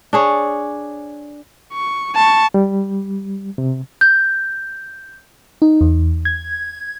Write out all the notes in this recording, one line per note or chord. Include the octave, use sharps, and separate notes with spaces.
D4 G#4 C#5
C#6
A5 C#6
G3
C3
G6
D#4
E2
G#6